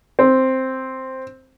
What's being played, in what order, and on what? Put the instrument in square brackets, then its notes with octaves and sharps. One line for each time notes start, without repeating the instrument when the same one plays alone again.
[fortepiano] C4